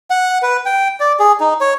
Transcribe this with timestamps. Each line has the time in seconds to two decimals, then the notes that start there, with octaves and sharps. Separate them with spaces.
0.10 F#5
0.42 B4
0.66 G5
1.00 D5
1.20 G#4
1.40 D#4
1.61 C#5